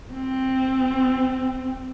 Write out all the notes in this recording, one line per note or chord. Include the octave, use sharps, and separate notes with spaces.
C4